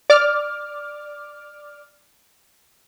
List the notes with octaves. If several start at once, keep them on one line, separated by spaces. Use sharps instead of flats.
D5 D6 F6